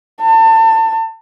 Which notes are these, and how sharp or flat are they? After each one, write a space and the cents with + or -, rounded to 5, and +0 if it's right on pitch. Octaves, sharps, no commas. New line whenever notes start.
A5 +30